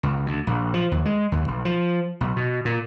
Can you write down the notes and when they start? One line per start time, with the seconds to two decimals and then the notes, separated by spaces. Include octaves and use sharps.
0.03 C#2
0.26 D2
0.47 A#1
0.74 F3
0.91 D#2
1.05 G#3
1.32 D#2
1.48 B1
1.65 F3
2.21 B1
2.36 B2
2.65 A#2